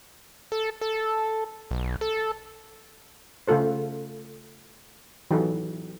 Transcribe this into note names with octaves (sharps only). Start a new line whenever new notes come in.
A4
A4
B1
A4
C#3 A3 F4 A4 C5
E3 F#3 D#4 G4 A4